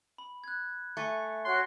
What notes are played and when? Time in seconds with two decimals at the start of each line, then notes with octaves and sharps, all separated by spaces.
0.18 B5
0.44 F#6 G#6
0.97 A3 G#5 A6 C#7
1.45 F#4 C#5 C6 F#6